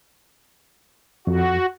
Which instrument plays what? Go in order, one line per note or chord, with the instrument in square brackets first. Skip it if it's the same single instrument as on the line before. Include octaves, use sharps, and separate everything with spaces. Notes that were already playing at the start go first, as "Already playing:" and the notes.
[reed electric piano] F2 [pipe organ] F#4